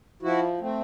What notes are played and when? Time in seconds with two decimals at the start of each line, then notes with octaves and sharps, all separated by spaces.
0.22 F3 E4 F#4
0.60 A3 C4